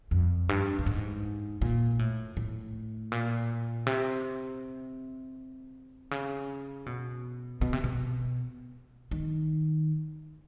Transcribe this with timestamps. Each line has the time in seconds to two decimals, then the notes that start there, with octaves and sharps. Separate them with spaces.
0.11 F2
0.49 G2
0.79 G2
0.86 G#2
1.62 A#2
1.99 A2
2.37 A2
3.12 A#2
3.86 C3
6.11 C#3
6.86 B2
7.62 B2
7.73 C3
7.84 B2
9.11 D#3